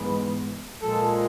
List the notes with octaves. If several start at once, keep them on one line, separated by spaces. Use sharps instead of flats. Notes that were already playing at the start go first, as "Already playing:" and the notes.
Already playing: G#2 E3 G#3 B3 B4
A#2 F3 G#3 A4